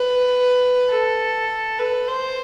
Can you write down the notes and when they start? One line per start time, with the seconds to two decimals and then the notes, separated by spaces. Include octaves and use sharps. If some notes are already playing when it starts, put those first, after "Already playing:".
Already playing: B4
0.90 A4
1.79 B4
2.08 C5